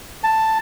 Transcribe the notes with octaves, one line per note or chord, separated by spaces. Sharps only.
A5